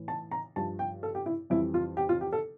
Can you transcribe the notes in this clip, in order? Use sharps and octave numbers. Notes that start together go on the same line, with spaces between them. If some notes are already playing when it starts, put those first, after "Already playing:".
Already playing: A2 E3
A5
A#5
G2 F3 A5
G5
A4
G4
E4
F2 E3 G3 E4
F4
G4
F4
G4
A4